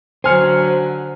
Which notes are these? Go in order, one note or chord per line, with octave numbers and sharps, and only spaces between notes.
D3 F#3 C5 G#5 F6 C#7